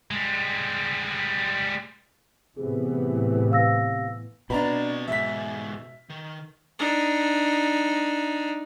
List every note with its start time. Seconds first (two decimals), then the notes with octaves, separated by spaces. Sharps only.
0.11 G3 G#3
2.57 A2 C3 E3 B3 G#4
3.52 F5 E6 A#6
4.50 B2 C4 D4 D5 A#5 B5
5.08 E2 G#2 E5 B6
6.10 D#3
6.79 D4 D#4